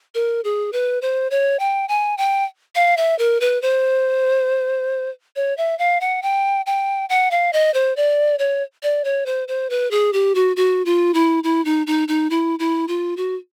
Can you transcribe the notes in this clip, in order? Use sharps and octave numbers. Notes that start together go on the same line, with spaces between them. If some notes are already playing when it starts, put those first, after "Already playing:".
A#4
G#4
B4
C5
C#5
G5
G#5
G5
F5
E5
A#4
B4
C5
C#5
E5
F5
F#5
G5
G5
F#5
F5
D#5
C5
D5
C#5
D5
C#5
C5
C5
B4
G#4
G4
F#4
F#4
F4
E4
E4
D#4
D#4
D#4
E4
E4
F4
F#4